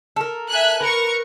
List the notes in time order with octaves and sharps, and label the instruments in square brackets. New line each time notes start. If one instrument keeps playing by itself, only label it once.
[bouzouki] A4 A#4
[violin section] E5 G#5 F#6
[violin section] A#4 C#6 [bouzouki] B4